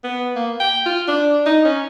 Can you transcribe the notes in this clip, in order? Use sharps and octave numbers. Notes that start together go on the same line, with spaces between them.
B3
A#3
G5
F4
D4
D#4
C#4